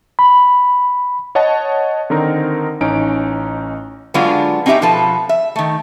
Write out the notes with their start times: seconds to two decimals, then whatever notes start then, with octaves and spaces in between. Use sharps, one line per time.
0.19 B5
1.35 C#5 D#5 F#5 A5
2.10 D3 D#3 C4 D#4 A#4
2.81 A1 C#4 D#4 D7
4.14 D3 F#3 G#3 B3 D4 F4
4.66 C4 C#4 D#4 G4 E5 G5
4.82 B2 F3 A4 B4 A5
5.29 E5
5.56 D#3 A3